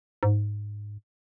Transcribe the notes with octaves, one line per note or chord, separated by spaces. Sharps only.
G#2